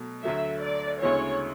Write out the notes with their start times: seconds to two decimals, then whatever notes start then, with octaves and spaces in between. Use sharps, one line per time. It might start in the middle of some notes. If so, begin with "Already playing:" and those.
Already playing: B2 F#3 A3
0.24 D2 D3 F#3 A3 E5
0.63 D5
1.01 D2 C#3 G#3 B3 E4 C#5